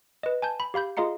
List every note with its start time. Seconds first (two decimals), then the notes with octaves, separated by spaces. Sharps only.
0.23 B4 D#5
0.42 G#5 A5 G6
0.60 B5
0.74 G4 F5 B5 G6
0.97 F4 G#4 D#5 F5 A#5 C#7